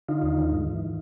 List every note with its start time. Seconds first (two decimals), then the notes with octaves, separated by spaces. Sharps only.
0.09 D3 D#4 F4
0.23 D#2
0.38 D#3
0.52 G#2
0.67 E3